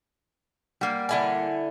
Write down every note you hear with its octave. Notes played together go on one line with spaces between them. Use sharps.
G3 A#3 F#5
D3 E4 G#5